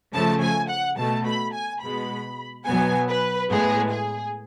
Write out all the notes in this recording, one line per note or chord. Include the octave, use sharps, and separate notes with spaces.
C#3 F3 A3 A5
G#5
F#5
B2 A3 A5
B5
G#5
B2 G#3 B3 B5
B2 F#3 B3 G#5
B4
A2 G#3 B3 G#4
G#4